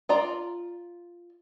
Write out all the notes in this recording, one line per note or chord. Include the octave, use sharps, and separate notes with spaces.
F4 D5 A#5